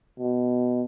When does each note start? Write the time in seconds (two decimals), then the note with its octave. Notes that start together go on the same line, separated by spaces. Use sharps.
0.20 B2